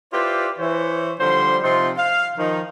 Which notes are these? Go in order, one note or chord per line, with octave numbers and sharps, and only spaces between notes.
E4 F4 G4 B4 C5 D5
E3 C5 C#5
D3 F3 G3 C5 C6
C3 F3 C4 D#4 F4 C6
F5
D#3 F3 D#4